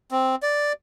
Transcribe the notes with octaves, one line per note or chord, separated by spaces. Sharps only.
C4
D5